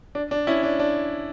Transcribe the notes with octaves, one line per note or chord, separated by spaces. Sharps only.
D4
D4
C#4 E4
D4
D4